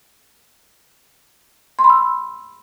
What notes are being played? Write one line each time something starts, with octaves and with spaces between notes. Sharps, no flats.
C6
B5
E6